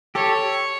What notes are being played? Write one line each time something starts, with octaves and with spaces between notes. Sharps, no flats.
G4 A4 C#5